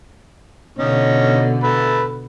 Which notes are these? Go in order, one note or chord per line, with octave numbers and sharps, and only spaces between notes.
B2 D3 C#4 D#4
A4 B4